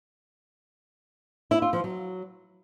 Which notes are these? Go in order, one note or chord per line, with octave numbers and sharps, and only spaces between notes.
E4
F4
F3
F#3